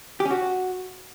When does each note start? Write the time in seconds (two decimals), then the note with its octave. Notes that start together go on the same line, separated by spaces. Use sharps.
0.20 G4
0.25 C#4
0.31 F#4